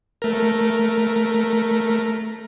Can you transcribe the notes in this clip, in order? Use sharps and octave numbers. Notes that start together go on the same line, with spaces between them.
A3 A#4